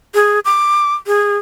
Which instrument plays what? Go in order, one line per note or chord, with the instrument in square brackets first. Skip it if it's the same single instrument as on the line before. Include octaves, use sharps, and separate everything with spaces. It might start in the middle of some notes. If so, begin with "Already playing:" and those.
[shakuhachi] G#4
D6
G#4